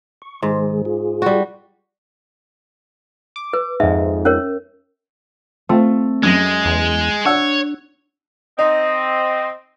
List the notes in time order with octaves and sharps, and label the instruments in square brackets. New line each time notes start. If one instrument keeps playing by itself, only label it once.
[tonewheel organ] C#6
[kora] G#2 [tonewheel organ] D#3 G#3 G#4
[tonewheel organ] F4 G#4
[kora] G3 F#4
[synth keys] D6
[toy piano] B4
[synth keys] F2 G#2 [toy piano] E5
[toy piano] C#4 A#4 C#5
[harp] A3 [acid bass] C4 [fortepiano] F4
[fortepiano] F#2 [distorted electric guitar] G#3 [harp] D#6 A#6
[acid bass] E2
[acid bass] D4 [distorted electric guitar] C#5 [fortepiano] F#5 E6
[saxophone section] C4 [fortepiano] D#4 [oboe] D#5